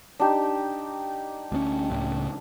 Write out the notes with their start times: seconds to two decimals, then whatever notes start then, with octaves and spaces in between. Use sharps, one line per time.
0.20 D4 D#4 G4
1.52 D2 A#3 C#4
1.90 C#2 A2 C#3